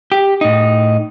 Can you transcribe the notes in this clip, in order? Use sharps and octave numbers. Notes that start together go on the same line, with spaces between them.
G4
A2 D#4